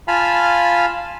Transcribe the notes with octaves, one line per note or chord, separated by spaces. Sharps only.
F4 F5 G#5 A5 B5 F6